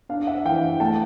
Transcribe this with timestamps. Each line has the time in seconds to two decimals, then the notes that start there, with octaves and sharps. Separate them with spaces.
0.09 D4 F5
0.27 E5 F#5
0.45 E3 F5 G5
0.80 A3 G5 A5